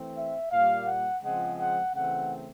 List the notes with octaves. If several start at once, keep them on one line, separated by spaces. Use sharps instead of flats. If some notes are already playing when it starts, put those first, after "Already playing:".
Already playing: E3 A3 C4
E5
A#2 G3 A#3 F5
F#5
C#3 F3 G#3 C4 F#5
F#5
C#3 E3 A3 C4 F#5